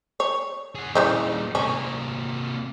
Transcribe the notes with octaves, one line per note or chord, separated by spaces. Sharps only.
C#5
G#4 F#5
A#2 C#3 E3 G3 D#4
C3 A#3 C#4